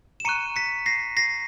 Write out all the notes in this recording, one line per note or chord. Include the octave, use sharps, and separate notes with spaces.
E7
A#5 C#6 F#6 C#7 D#7
B6 C#7
A#6 C7
A#6 C7